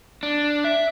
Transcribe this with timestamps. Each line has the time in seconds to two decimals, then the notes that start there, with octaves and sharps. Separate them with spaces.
0.23 D4
0.65 E5